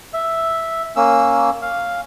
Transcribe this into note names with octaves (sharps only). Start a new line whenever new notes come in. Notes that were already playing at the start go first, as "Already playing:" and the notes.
E5
A#3 C#4 E6
F5